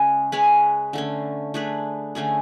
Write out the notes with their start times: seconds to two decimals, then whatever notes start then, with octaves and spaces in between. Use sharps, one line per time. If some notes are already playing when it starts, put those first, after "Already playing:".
Already playing: C#3 G#3 C#4 G#4
0.32 G#3 C#4 G#4 B4
0.93 D3 A3 C#4
1.54 A3 D4 G#4 B4
2.15 D3 A3 C#4 G#4